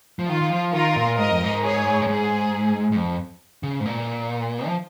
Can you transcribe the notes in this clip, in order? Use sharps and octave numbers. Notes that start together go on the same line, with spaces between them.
F3
D#3 F4
D#3
F3
D#3 F4 A#4
A#2
G#2 A#4 D#5
F2
G#2
G#4 C#5
A#2
G#2 G#4
G#2
F2
C#3
G#2
A#2
F3